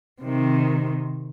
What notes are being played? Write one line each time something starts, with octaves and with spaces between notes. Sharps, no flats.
C3 D#3